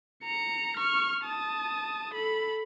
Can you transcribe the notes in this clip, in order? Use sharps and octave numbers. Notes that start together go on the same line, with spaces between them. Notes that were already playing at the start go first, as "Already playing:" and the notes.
A#5 C#7
C#6 F6
A5 D#6
A4 B5